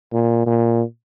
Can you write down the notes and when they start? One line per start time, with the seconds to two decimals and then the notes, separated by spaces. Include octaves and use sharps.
0.13 A#2
0.47 A#2